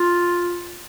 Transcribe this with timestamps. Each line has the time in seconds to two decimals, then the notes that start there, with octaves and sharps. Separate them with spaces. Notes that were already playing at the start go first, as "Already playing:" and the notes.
Already playing: F4